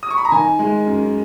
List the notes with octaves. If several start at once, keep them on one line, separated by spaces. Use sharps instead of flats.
D#6
C#6
B5
A#5
D#3 G#5
G#3
F#2